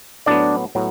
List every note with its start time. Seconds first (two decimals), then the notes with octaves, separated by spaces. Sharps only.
0.26 A2 F#3 B3 D4 D5
0.75 A2 F#3 B3